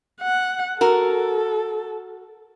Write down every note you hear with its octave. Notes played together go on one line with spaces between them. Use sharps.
F#5
F#4 A4 A#4